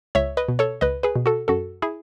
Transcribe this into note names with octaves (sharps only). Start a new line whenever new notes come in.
C#2 C#5 E5
B4 D#5
B2
A4 C#5
C#2 B4 D#5
G#4 B4
B2
F#4 A4
F#2 F#4 A4
E4 G#4